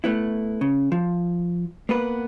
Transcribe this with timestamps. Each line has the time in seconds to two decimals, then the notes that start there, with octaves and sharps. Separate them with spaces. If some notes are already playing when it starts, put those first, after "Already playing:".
0.04 A3 B3 E4
0.61 C#3
0.92 F3
1.89 A#3 B3 B4